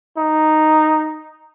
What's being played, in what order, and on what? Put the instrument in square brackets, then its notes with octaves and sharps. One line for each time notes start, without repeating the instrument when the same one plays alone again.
[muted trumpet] D#4